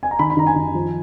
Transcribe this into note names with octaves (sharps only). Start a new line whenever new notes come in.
G#5
A#5
D#3 B5
B5
D#3 A#5
G#5
D#3
F3